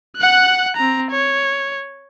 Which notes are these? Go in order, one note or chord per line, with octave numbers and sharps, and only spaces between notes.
F#5 F#6
C4 A#5
C#5